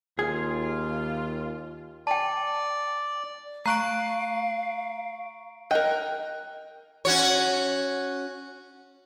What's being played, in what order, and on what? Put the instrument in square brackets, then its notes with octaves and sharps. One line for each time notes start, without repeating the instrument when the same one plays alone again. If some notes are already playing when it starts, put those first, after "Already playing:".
[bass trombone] D#2 [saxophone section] F4 [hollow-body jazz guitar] G#4
[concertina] D5 [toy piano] G5 A5
[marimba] A3 F#6 [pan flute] F5 [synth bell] A#5 C#6 D7
[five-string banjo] A#4 G5 [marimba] D#5 [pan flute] F#6
[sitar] C#4 F#4 C#5